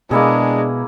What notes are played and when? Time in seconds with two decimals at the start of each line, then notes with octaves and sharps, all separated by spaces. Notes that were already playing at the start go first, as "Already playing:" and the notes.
0.11 B2 G#3 A#3 D4 E4 G#4